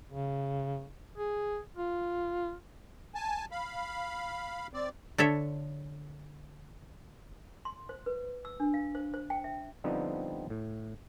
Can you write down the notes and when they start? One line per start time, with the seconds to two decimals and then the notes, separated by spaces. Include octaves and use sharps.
0.11 C#3
1.18 G#4
1.77 F4
3.15 G#5 A5
3.51 F5 B5
4.74 C4 D5
5.18 D3 A4 C#5 E5
7.65 C6
7.89 C5
8.06 B4
8.45 E6
8.60 D4
8.74 F5
8.95 C5
9.14 C5
9.30 G5
9.44 E5
9.84 D3 F3 G3 B3 C4 D#4
10.50 A2